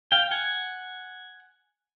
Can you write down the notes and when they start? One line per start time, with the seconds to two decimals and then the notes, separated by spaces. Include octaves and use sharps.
0.12 F5 G5
0.31 F#5 G#5